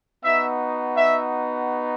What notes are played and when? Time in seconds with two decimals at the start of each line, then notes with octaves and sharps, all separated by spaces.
0.23 B3 D#4 F#4 E5
0.96 E5